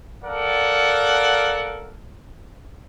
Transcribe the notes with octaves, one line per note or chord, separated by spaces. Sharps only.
A4 A#4 D5 F5 F#5